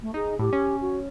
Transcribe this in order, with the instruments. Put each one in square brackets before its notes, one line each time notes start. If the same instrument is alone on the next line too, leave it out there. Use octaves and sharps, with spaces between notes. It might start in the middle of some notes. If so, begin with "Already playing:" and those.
[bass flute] A3
[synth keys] D#4 [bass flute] G#4
[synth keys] A2 [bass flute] G4
[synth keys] C#4
[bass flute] F#4